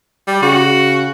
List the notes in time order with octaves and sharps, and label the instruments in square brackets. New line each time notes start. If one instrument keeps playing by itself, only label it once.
[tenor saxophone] G3
[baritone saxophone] C#3 [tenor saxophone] F#4